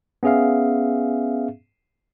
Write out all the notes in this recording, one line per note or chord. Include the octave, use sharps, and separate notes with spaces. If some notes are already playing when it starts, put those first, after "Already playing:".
B3 C#4 G#4 E5 F5